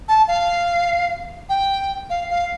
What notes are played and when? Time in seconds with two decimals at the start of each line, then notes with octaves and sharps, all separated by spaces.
0.08 A5
0.28 F5
1.49 G5
2.10 F5
2.30 F5